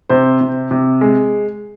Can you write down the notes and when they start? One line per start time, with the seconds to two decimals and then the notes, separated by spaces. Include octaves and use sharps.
0.09 C3 C5
0.41 C3
0.71 C3
1.01 G#3